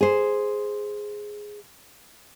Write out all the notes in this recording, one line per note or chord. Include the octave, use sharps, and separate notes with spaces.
G#4 C5